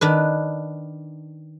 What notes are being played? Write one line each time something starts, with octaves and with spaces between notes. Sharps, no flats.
D#3 D4 B4